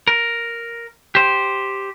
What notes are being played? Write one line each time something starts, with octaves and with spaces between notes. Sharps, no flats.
A#4
G4 C5